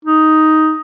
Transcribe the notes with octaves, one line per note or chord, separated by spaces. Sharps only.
D#4